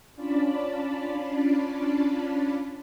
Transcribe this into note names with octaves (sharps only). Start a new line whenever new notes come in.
C#4 D4 F4 D5 A5 B5